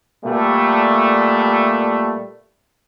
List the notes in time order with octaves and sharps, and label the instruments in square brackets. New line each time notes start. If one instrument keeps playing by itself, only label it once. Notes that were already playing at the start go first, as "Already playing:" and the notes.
[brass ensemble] A#2 G3 A3